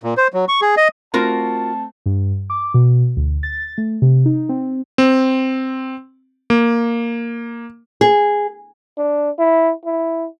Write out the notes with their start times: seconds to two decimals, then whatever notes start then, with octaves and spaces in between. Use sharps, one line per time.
0.03 A#2
0.17 C5
0.34 F#3
0.48 C#6
0.62 G#4
0.77 D#5
1.14 A3 C4 F4 F#4 A#4 A5
2.06 G2
2.50 D6
2.74 B2
3.17 D2
3.43 A6
3.78 A3
4.02 C3
4.26 D#4
4.49 C4
4.98 C4
6.50 A#3
8.01 G#4
8.98 D4
9.39 E4
9.85 E4